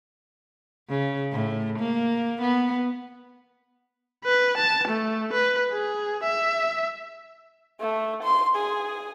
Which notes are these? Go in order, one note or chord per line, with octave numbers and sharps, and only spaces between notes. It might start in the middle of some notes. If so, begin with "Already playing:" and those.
C#3
A2
A#3
B3
B4
A5
A3
B4
G#4
E5
A3
C6
G#4